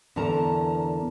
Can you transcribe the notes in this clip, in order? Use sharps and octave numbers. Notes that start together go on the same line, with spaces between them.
E2 D3 A#4 A5 A#5